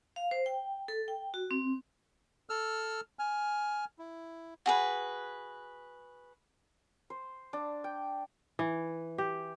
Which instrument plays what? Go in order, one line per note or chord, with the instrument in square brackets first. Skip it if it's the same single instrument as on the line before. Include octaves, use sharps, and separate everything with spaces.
[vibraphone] F5
C5
G5
A4
G5
F#4
C4
[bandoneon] A4 E6 F6
G#5 F6
E4
[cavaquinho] F#4 G#4 B4
[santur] C5
D4
G5
[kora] E3
G4